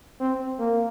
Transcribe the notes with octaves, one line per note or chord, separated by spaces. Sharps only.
C4
A#3